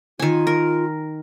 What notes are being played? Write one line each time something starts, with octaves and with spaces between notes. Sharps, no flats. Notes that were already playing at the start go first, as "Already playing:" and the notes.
D#3 F4 G#5
A#4